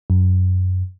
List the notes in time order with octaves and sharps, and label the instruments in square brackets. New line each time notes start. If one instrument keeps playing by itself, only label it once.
[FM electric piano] F#2